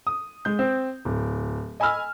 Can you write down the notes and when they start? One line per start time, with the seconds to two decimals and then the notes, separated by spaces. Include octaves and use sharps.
0.07 D#6
0.45 G#3 G6
0.59 C4
1.05 D1
1.80 D#5 G#5 B5 E6 F6